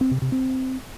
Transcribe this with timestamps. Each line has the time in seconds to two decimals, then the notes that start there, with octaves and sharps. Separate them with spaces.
0.01 C4
0.11 C3
0.22 C3
0.32 C4